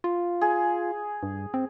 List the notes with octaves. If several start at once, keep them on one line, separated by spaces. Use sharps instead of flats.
F4
G#4
G2
C4